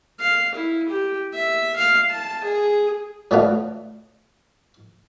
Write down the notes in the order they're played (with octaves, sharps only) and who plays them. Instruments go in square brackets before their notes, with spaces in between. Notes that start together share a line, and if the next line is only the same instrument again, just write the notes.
[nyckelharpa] F5
E4
G4
E5
F5
A5
G#4
[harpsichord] A2 E3 A3 B3 D4 F4